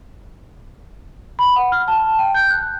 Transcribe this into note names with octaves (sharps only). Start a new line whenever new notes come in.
B5
F#5
F6
A5
G5
G6
F#6